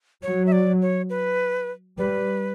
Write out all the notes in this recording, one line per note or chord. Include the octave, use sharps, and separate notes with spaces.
F#3 C#5
E5
D5
C#5
B4
G3 B4